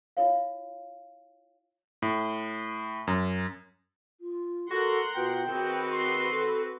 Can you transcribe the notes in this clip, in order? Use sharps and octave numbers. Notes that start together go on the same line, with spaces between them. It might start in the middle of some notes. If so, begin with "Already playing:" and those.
E4 F4 C#5 F5
A2
F#2
F4
F#4 A4 A#4 F#5 C6
B2 F4 G5
D#3 C4 F#4 G#4 B4
C6
A4